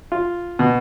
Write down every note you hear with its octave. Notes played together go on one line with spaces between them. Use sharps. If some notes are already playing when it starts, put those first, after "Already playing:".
F4
B2